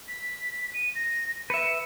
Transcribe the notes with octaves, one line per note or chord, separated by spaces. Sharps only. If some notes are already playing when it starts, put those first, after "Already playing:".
B6
D#7
A#6
B4 E5 C#7